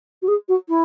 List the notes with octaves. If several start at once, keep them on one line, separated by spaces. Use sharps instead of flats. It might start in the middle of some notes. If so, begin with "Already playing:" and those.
F#4
G#4
F#4
E4